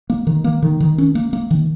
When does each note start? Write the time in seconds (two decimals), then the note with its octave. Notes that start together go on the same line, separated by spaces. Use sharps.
0.10 A#3
0.27 D#3
0.44 A#3
0.62 D#3
0.80 D#3
0.98 C#4
1.15 A#3
1.33 A#3
1.51 D#3